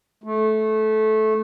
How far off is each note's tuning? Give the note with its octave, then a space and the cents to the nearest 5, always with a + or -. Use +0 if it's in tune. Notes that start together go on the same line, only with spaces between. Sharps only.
A3 -15